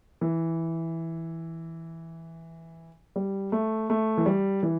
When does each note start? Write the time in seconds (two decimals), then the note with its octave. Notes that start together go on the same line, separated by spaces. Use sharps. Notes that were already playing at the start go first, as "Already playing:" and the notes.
0.21 E3
3.16 G3
3.52 A3
3.90 A3
4.18 E3
4.26 G3
4.63 E3